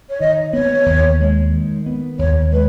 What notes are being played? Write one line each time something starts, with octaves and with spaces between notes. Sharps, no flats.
C#5
D#3 D#5
B3 C#5
D#2
G#3
D#3
B3
D#2 C#5
G#3 B4